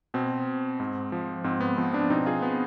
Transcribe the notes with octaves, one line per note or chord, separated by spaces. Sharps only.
B2 C4
G#2
F3
G#2 C4
B3
F3 C4
B3 D4
B2 C4 D#4
F4 G#4
B3